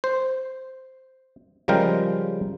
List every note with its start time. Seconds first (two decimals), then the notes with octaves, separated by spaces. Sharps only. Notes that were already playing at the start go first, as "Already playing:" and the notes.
0.04 C5
1.68 C#3 F3 G3 G#3 A#4 G5